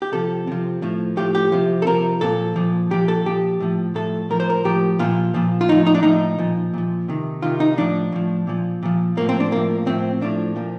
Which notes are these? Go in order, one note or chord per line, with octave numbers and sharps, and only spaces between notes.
G4
C3 F3 A4
C3 F3
A2 F3
A2 F3 G4
G4
C3 F3
A4
C3 F3 A#4
A#2 F3 A4
A#2 F3
A#2 F3 G4
A4
A#2 F3 G4
A2 F3
A2 F3 A4
A2 F3 A#4
C5
A#4
A2 F3 G4
A#2 F3 F4
A#2 F3
F4
A2 F3 D#4
D#4
D4
A2 F3 D#4
A#2 F3
A#2 F3
C3 D#3
C3 D#3 F4
D#4
A2 F3 D4
A2 F3
A#2 F3
A#2 F3
A2 F3 A#3
C4
D4
A2 F3 A#3
A2 F3 C4
A2 F3 D4
A#2 F3